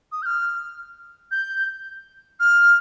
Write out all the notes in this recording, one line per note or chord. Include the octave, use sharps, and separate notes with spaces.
D#6
G6
F6
G6
F6